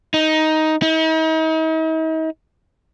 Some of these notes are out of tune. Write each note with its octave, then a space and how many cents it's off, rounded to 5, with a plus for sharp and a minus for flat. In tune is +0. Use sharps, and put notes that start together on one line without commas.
D#4 +10
D#4 +45